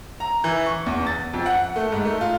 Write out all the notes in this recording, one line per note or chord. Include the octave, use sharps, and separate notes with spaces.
A#5
E3
C#6
E2
A6
F2
F#5
A3
G#2
A3
F4